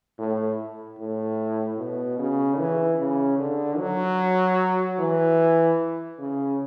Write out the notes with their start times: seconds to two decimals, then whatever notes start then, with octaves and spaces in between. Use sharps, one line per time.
0.18 A2
0.99 A2
1.78 B2
2.18 C#3
2.58 E3
2.99 C#3
3.39 D3
3.78 F#3
4.99 E3
6.19 C#3